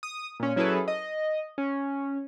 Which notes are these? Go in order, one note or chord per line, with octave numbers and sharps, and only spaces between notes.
D#6
A#2 C#4
F#3 C#4 E4 G#4 A4 B4
D#5
C#4